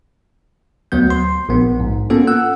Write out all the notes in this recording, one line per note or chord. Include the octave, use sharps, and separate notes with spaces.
D2 F#3 B3 G6
C6
A#1 B3
G#2
A#3 B3 C#4 F4 A4
F#5 E6 F#6